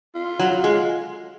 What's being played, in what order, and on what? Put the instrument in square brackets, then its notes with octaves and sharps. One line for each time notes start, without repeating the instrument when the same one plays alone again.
[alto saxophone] F4
[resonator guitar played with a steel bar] F#3
G#3